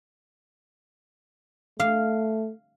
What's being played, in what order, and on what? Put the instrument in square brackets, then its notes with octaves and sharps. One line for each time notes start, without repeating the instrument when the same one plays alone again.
[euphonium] A3 [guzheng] F5